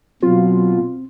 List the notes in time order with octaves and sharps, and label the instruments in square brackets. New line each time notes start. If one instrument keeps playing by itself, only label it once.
[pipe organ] B2 [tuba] F#3 [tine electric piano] C4 [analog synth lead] F4